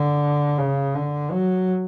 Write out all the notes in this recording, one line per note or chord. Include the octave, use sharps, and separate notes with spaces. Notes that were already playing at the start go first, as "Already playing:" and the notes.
Already playing: D3
C#3
D3
F#3